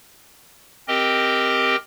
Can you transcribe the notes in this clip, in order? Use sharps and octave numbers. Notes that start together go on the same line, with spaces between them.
C4 G4 A#4 D#5 G5